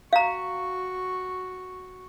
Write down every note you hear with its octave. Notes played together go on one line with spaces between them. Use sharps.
F#4 F5 A#5 C#6